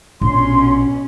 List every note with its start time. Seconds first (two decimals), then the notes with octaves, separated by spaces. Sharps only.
0.21 A#1 B2 C#4 C6